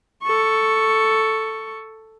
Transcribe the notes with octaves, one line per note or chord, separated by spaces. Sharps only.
A4 C#6